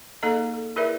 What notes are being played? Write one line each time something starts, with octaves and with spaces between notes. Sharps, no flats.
A#3 D#4 G#4 A4 D#5 A#5
A4
E4 G#4 A#4 B4 D5 E5